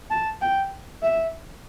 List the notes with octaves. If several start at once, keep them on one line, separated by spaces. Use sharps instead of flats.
A5
G5
E5